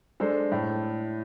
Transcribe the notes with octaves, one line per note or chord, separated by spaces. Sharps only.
G#3 D4 A4 C5
A2